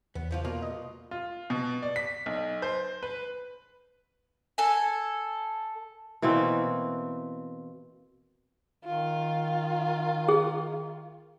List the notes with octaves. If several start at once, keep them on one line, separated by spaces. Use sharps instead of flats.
E2 B3
C#2 F3 F4
B2 A#3 F4 D5
D#5
F4
B2
D5
B6
B1
C5
B4
A4 G#5
B2 E3 A#3 C4
D#3 F4
G#4